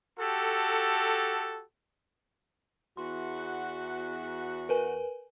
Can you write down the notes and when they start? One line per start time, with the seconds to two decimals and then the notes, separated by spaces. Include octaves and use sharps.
0.19 F#4 G4 A4
2.97 E2 F#4 C6
4.69 A#4 B4 G#5